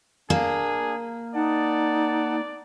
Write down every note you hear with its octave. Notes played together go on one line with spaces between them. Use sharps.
A#3 D4 G#4
D#4 D5 F#5 A5